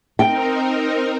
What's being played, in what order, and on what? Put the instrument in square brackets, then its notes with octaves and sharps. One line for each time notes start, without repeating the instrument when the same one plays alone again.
[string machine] C4 D#4 A#4 [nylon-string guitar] G5